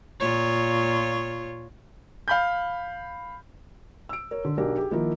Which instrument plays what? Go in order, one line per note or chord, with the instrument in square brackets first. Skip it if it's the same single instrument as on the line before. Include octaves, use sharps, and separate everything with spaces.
[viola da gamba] A#2 F4 C#5
[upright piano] F5 B5 G6
[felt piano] E6 D7
A#4 C#5
D3
B1 B2 D4 G4 A#4
G4 G#4
D#3 F3 A#3 E4 A#4